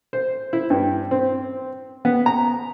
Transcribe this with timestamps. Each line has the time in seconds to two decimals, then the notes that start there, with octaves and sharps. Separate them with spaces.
0.13 C5
0.53 E4
0.70 G2
1.11 C4
2.05 B3
2.26 A#5